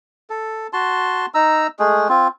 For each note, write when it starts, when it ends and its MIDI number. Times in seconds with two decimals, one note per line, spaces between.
0.30 0.67 69
0.73 1.26 66
0.73 1.26 81
0.73 1.26 84
1.34 1.67 63
1.34 1.67 82
1.34 1.67 88
1.79 2.08 56
1.79 2.08 57
1.79 2.08 68
2.09 2.28 60
2.09 2.28 65